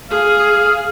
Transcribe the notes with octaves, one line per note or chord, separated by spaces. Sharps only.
G#4 F5